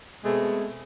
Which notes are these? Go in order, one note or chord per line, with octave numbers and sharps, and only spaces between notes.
B2 G#3 A3 C4 G#4